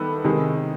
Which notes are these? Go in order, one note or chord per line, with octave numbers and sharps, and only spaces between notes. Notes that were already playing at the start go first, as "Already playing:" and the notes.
Already playing: D#3 G3 B3 E4 A4
C3 D#3 G#3